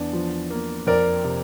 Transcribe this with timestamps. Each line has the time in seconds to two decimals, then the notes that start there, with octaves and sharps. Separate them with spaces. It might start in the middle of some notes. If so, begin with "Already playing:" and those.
Already playing: E2 D4
0.13 F3
0.50 A#3
0.86 F2 A#4 D5
1.24 C3